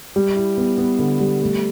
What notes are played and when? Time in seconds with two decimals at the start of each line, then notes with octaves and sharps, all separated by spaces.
0.16 G3
0.36 E4
0.57 B3
0.78 B3
0.99 D3
1.20 G3
1.42 A3